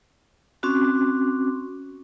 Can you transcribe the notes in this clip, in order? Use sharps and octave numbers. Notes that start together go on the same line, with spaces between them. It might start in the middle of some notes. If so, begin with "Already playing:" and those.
C4 C#4 F#4 D6